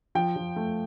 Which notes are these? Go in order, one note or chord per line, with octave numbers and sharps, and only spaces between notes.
F3 G5
F3
A3